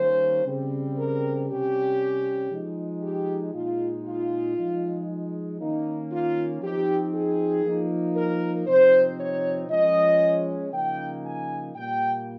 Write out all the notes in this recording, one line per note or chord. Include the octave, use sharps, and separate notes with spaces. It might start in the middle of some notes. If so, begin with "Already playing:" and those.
Already playing: D#3 G3 A#3 C#4 C5
C#3 G3 C4
A#4
C3 G3 C#4 G4
F3 G#3 D#4
G4
A#2 G#3 D#4 F4
F4
F3 G#3 D#4
D#3 A#3 C#4 D#4
F4
F3 C4 D#4 G4
G#4
F3 A#3 D#4
A#4
C3 F3 C4 D#4 C5
C#5
F3 G#3 C#4 D#5
C#3 F3 A#3 D#4 G5
G#5
A#2 G3 A#3 G5